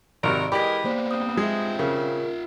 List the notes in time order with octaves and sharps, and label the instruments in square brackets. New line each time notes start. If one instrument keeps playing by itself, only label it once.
[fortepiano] G#1 C3 [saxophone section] F#4 A#4 [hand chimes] D5 D7
[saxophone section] E3 G#3 D#5 [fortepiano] G4 [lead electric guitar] A#4 [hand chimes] B5 B6
[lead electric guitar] A#3 B3 [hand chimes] C5 D5
[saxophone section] G2 C4 [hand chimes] D#6
[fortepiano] G#3 [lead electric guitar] F4 E5
[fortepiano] C#3 [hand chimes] A#4